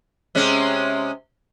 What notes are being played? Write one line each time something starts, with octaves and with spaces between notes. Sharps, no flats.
C3 G#3 C#4